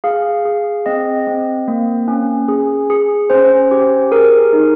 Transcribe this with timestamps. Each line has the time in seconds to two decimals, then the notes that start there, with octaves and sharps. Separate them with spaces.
0.04 G#4 F5
0.45 G#4
0.86 C4 D#5
1.27 C4
1.68 A#3
2.08 C#4
2.48 G#4
2.90 G#4
3.30 C#4 C5
3.71 G4
4.12 G#4 A#4
4.53 D#4